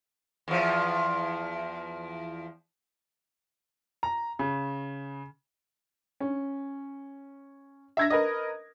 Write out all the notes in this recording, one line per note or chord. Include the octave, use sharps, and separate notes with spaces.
E2 F3
A#5
C#3
C#4
E5 G#6 A#6
A#4 B4 D#5